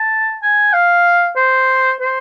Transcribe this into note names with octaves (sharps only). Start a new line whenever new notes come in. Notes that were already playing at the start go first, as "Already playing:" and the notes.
Already playing: A5
G#5
F5
C5
C5